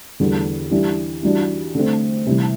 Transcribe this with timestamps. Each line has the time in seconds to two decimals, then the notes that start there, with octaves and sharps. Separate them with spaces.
0.20 E2 D3 G3
0.71 E3 G3 D4 G4
1.23 E3 G3 D4 F#4
1.75 D3 A3 C4
2.26 C3 E3 G3